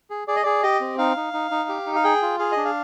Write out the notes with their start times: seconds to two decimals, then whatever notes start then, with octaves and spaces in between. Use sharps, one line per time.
0.10 G#4
0.28 G#4 D5
0.36 D#5
0.43 G#4 D5
0.63 G4 D#5
0.81 C4
0.98 D#4 F5
1.16 D#4
1.33 D#4
1.51 D#4
1.69 G4
1.87 D#4
1.95 F5
2.04 G#4 G5
2.22 F4
2.39 G#4 F5
2.52 D#5
2.57 D4
2.65 F5